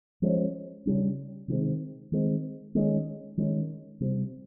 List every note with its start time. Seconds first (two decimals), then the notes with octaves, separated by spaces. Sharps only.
0.22 F3 G#3 C#4
0.86 C#3 G3 C#4
1.48 C3 D#3 G#3 C4
2.12 D#3 G#3 C4
2.75 D#3 G#3 C#4
3.37 D#3 G#3 C#4
4.00 C3 G3 C4